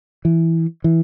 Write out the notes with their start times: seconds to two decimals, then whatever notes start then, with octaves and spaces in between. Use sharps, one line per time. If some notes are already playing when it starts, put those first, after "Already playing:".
0.25 E3
0.84 E3